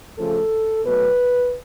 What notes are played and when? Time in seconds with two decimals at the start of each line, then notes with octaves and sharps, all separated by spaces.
0.18 C#3 F3 A3 A4
0.84 B2 F#3 A3 B4